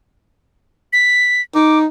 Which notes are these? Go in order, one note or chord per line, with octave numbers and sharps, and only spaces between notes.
B6
D#4 D6